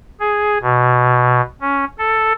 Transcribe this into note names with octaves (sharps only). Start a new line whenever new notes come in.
G#4
B2
C#4
A4